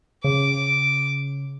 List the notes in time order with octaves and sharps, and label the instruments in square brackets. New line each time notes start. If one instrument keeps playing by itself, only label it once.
[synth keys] C#3 [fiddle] D6